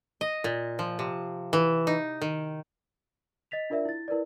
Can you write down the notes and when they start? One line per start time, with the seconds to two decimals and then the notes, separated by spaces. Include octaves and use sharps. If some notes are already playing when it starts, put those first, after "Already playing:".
0.21 D#5
0.44 A#2
0.79 F3
0.99 C3
1.53 E3
1.87 D#4
2.22 D#3
3.51 D#5 A6 B6 F7
3.70 D4 F4 A#4 D5 E5
3.85 E4 A6
4.08 E4 A#4 B4 D5